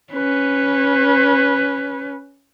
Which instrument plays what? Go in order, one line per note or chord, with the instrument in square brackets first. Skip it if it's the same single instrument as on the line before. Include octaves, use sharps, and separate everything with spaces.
[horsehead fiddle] C#4 B4